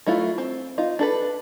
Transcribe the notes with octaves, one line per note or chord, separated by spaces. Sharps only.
F#3 A3 E4 F4
C4
D#4 F4
D4 A4 B4